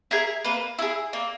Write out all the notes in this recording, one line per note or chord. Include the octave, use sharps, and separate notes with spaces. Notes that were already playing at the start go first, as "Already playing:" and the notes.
E4 G#4 A#4
A#3 B4
E4 G#4
A#3